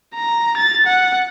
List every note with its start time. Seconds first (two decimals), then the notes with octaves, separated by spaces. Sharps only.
0.15 A#5
0.57 A6
0.86 F#5